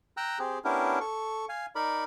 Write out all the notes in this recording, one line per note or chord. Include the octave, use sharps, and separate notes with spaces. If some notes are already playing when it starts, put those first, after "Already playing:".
G5 A#5 E6 F#6
C4 G4 G#4
B3 C#4 D4 E4 G4 A#4
A4 C#6
F5 G#5
D#4 A#4 D5 B5